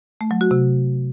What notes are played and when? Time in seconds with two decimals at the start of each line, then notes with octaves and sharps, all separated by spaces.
0.21 A3
0.31 F#3
0.41 F#4
0.51 C3